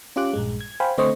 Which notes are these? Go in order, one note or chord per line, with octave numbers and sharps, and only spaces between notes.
C#4 F4 G4 D6 F#6
A#1 G2 G#3
G#6
C5 F5 G5 G#5 B5
D3 A3 C4 C5 D#5 C#6